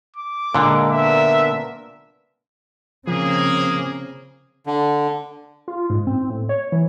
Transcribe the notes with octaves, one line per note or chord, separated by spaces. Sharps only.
D6
A#2 D3 G#3 A#4
B3 D4 A#4 E5
C#3 F3 A#3 C4 G#4
D3
F4
G#2
C4
A2
C#5
E3